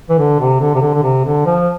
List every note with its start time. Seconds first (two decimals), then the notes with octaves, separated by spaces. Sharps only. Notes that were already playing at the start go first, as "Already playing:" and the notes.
0.09 E3
0.18 D3
0.39 C3
0.60 D3
0.75 C3
0.82 D3
0.94 D3
1.03 C3
1.24 D3
1.46 F3